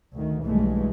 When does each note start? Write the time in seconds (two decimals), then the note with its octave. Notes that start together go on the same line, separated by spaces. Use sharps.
0.14 D2 D#3
0.45 B1 G2 B2 E3 G#3 A3